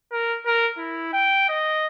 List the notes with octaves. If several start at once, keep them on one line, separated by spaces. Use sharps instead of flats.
A#4
A#4
E4
G5
D#5